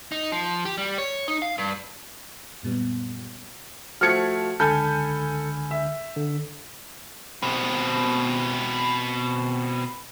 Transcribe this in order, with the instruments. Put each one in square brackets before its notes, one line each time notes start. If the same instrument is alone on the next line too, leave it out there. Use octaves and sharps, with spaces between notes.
[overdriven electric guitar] D#4
F3
G4
G3
C#5
D#4
F5
G2
[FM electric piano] F#2 A#2 G3 B3
[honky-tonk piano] F3 A3 G#6 [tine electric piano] F#4 [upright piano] F6 C#7
[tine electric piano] C#2 D3 F6 [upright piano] A4 [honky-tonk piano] G#5 B5 G6
[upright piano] E5
[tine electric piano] D3
[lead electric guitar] B2 C4